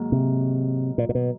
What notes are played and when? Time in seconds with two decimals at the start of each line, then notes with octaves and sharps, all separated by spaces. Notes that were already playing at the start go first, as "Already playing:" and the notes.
Already playing: G#2 D#3 F#3 A#3
0.12 C3
0.98 A#2
1.09 A#2
1.15 B2